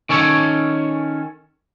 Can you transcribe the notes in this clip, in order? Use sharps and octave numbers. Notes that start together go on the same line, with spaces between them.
D#3 C#4 A4 C#5